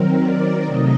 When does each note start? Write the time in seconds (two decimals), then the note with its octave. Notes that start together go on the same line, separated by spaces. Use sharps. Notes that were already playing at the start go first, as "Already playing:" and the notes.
Already playing: D#3 F#3 C4 A#4
0.21 D5
0.65 C3 F#3 A3 D#4 D#5